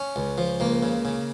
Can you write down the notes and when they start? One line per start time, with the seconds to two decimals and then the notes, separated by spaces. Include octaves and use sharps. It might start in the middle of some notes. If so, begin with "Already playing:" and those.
Already playing: C#4
0.16 C#2
0.38 F3
0.60 C#2 A#3
0.83 C#3
1.05 C#3